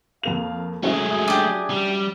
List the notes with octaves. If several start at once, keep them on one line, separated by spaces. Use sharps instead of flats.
F2 A#3 F5 F7
F#3 G#3 A3 C#4 E4 G#4
D4 G4
G3